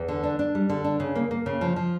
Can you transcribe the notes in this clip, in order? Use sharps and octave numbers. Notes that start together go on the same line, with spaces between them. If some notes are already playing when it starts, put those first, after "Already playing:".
Already playing: E2
D3
D4
D4
G3
D3
D4
C#3
A#3
A#3
C#3
F3
F3